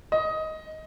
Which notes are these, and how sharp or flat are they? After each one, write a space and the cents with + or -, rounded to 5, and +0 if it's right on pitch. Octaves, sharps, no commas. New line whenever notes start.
D#5 +15